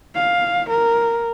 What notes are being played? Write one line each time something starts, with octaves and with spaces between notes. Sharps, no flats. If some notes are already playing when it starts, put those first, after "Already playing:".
F5
A#4